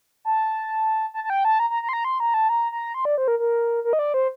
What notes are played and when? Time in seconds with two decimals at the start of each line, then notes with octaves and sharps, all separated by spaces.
0.25 A5
1.14 A5
1.24 A5
1.30 G5
1.45 A5
1.60 A#5
1.70 A#5
1.83 A#5
1.89 C6
1.93 A#5
2.05 C6
2.20 A#5
2.34 A5
2.49 A#5
2.72 A#5
2.94 C6
3.05 D5
3.18 C5
3.28 A#4
3.39 A#4
3.84 A#4
3.93 D#5
3.99 D5
4.14 C5